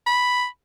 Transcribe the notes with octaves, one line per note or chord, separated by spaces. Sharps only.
B5